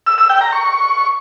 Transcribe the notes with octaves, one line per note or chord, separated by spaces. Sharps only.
E6
E6
G5
A#5
C#6